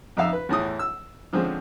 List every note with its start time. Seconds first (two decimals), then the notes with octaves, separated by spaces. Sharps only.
0.17 F2 D#4 E5 F5 E6
0.33 B4
0.49 E2 A2 E3 D#6
0.79 E6
1.33 D3 F3 G#3 C4 C#4